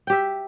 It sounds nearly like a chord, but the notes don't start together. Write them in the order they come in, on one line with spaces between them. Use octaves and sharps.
G5 G4 E5